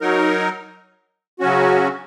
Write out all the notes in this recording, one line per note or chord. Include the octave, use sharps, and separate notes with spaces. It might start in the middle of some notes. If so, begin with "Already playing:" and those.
F#3 D#4 A#4
C#3 F#3 C#4 F#4